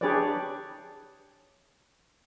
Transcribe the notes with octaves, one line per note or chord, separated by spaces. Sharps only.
D4 G4 G#4 B4 C#5 D5